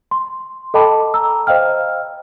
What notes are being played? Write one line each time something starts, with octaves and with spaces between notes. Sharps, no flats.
C6
A4 D#5 G5 A5 B5 D6
A#5 E6
C5 D#5 F5 G5 F6